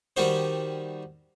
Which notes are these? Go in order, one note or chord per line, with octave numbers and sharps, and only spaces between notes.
D#3 G3 F#4 C5